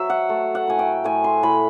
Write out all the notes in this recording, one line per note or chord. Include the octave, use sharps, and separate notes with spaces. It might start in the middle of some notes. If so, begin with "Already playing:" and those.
Already playing: F#3 E5
F#5
A3
F#5
A2 G#5
G5
A2 G#5
C6
A2 B5